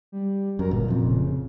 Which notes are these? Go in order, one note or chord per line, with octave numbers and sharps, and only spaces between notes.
G3
F#2 A#4
G1 A#2
F1 F2
C#3